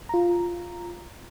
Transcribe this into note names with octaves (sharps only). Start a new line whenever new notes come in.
F4 A#5